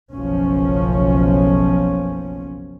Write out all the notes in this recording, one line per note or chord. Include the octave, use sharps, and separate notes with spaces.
F#1 B1 F3 C#4